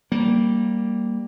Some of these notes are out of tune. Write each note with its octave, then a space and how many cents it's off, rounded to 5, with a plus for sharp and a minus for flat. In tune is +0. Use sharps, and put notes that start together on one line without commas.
G3 +0 A#3 +0